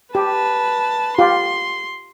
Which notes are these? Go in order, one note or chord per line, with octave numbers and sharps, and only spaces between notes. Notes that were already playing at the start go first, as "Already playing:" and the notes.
G4 B4 A5
F4 G4 C6